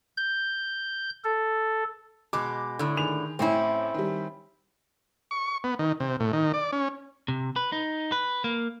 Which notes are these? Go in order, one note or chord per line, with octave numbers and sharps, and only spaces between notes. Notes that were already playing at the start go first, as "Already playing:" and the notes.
G6
A4
B2 G#3 D6
A2 D3
D#3 G#4 F7
A1 A2 C4 C#4 E4
D#3 G3
C#6
B3
D#3
C3
A2
D#3
D5
C#4
C3
B4
D#4
B4
A#3